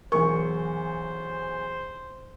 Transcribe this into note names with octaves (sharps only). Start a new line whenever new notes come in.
B1 E2 A#4 C5 C#6